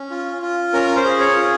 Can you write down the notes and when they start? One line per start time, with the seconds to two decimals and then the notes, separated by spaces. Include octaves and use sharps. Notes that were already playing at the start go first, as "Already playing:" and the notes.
Already playing: C#4
0.11 F4
0.42 F4
0.73 C#4 A#4
0.96 C5
1.05 G#4
1.20 C#5
1.36 F4